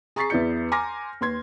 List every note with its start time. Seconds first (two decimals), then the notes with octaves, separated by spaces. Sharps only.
0.16 G#4 A#5 C#6 A6 B6 C7
0.30 E2 B3 E4 D5 G6 C#7
0.72 G#5 A#5 C6 D6 F6 A#6
1.21 D#2 B4 C6 G#6